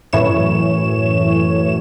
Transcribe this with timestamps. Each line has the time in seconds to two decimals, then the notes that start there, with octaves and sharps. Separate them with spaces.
0.13 F#2 A2 E3 C#5 E7